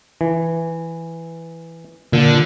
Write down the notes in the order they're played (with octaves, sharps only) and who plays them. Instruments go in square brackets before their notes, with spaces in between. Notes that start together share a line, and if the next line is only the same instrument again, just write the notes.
[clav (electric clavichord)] E3
[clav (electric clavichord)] A#2 [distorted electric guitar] D3